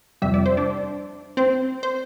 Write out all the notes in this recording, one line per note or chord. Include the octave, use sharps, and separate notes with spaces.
F2 C3 G3 E5
D5
C5
D4 D5
C4 C5
C5